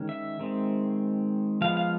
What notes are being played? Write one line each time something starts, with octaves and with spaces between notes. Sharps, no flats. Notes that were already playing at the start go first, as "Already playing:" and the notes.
Already playing: D#3 G#3 C#4
E5
D#3 G#3 C4
F3 G#3 B3 F5
F5